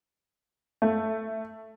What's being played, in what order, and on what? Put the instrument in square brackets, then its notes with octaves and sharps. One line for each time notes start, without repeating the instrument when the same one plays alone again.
[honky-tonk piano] A3